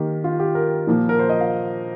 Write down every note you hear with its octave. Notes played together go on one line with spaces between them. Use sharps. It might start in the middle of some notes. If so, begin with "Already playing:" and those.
Already playing: D#3 A#3 G4
F4
G4
A#4
A#2 F3 A#3
A#4
C5
D#5
F5